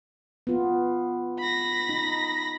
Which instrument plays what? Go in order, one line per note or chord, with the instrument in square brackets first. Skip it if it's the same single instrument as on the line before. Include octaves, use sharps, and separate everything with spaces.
[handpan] B3 F4
[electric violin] B5 A#6
[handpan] D#4